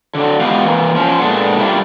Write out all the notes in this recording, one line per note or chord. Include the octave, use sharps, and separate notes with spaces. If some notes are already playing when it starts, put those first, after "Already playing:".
D3 F#3
G#3 B3 F4 G4 D#5 F5
E3 A#3
F3 C#4
A#2 G#3 B3 D4 A4
G3 A3 A#3 D4 E4 F4